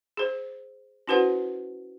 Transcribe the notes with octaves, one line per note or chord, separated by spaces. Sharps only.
G#4 C5
C#4 E4 F#4 B4 C5 F#5